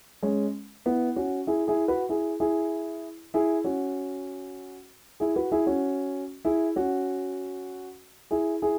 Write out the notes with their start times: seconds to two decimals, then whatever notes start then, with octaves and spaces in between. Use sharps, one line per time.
0.23 G#3 C#4
0.86 B3 E4
1.16 C#4 F#4
1.47 E4 G#4
1.68 E4 G#4
1.88 F#4 B4
2.09 E4 G#4
2.40 E4 G#4
3.34 E4 G#4
3.64 C#4 F#4
5.20 E4 G#4
5.36 F#4 B4
5.52 E4 G#4
5.66 C#4 F#4
6.45 E4 G#4
6.76 C#4 F#4
8.31 E4 G#4
8.62 E4 G#4